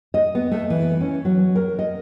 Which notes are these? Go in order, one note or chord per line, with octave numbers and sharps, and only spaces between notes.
D#5
B3
A3
E3
C#4
F#3
A#4
D#5